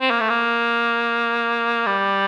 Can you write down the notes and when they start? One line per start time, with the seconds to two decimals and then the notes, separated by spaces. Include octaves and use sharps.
0.01 C4
0.11 A#3
0.20 A3
0.30 A#3
1.86 G3